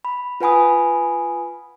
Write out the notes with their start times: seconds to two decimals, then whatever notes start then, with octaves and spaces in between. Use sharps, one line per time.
0.05 B5
0.40 F4 B4 F#5 G#5 B5 D#6